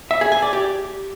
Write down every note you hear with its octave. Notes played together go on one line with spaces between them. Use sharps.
E5
G#4
G#5
D5
G4